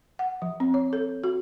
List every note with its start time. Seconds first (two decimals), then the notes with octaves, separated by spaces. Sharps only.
0.19 F#5
0.42 F3
0.60 C4
0.74 C#5
0.93 A4
1.24 F#4